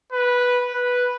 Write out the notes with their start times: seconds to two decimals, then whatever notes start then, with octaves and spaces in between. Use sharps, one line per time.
0.13 B4
0.74 B4